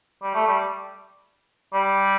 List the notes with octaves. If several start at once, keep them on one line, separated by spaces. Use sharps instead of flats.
G3
A3
G3
G3